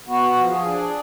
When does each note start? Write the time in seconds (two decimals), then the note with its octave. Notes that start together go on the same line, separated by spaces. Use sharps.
0.07 B3 F#4
0.36 F3
0.47 F#4
0.51 G#4
0.66 D4